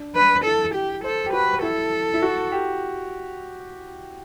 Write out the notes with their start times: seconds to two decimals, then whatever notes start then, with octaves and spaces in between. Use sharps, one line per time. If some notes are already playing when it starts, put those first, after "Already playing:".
Already playing: D4
0.16 D4 B4
0.45 E4 A4
0.75 G4
1.04 A4 C5
1.26 G4
1.33 F#4 B4
1.62 E4 A4
2.14 E4
2.22 F#4
2.52 G4